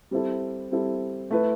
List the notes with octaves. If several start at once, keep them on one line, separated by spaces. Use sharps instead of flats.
G3 C4 E4 A4
G3 C4 E4 A4
A3 E4 B4